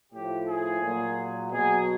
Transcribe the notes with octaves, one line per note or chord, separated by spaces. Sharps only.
A2 F3 G4
G#4
A#2 F#3
B2 F#3 G#4